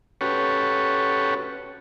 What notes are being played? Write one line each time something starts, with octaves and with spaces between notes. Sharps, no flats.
C#4 F#4 G4 A4 B4 C#5